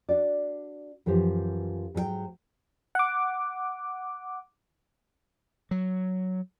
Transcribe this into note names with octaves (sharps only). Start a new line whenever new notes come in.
D4 F#4 D5
F#2 E3 F3 G4 C5
G#2 F#3 G#4 G5
F#5 D6
F#3